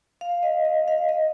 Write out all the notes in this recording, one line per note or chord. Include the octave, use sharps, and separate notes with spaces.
F5
D#5
D#5
F5
D#5